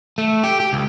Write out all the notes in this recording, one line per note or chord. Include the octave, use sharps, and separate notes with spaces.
A3
G4
G4
C#2